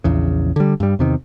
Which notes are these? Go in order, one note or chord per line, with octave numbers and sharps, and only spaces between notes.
A#1 E2 C#3
D3 G3
G2 G3
E2 C3 D#3